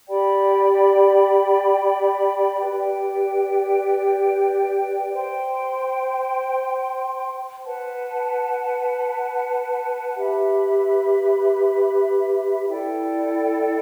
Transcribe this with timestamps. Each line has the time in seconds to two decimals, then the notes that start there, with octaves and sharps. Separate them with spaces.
0.08 G4 D5 G5 B5
2.60 G4 B4 D5 G5
5.12 C5 G5 C6
7.64 B4 F#5 A5
10.16 G4 B4 E5 B5
12.67 E4 A4 D5 G5